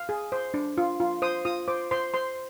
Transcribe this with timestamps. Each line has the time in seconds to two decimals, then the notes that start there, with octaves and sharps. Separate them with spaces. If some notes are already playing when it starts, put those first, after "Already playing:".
Already playing: F5
0.09 G#4
0.32 C5
0.54 D4
0.78 F4
1.00 F4
1.22 C5 D#6
1.45 F4 D#6
1.68 C5 D6
1.91 C5 C6
2.14 C5 C6